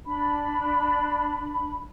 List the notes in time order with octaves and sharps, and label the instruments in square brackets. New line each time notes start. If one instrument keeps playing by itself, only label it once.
[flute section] D4 B5